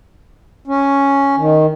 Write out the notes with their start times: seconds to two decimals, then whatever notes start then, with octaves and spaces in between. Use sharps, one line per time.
0.68 C#4
1.37 D#3